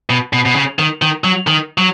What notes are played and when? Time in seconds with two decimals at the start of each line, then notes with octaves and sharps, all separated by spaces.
0.10 B2
0.33 B2
0.46 B2
0.56 C#3
0.79 D#3
1.02 D#3
1.24 F#3
1.47 D#3
1.78 F#3